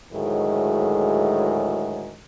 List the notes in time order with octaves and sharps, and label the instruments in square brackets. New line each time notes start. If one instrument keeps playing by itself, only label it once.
[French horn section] D2 A2 D#3 F#3 G#3